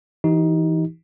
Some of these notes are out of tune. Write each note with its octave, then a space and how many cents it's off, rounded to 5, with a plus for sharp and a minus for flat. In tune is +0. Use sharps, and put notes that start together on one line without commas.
E3 +0 D#4 +20 G4 -30